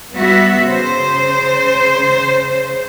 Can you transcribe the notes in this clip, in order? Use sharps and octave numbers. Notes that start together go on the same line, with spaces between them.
G3 B3 F#4 E5
C#3 C5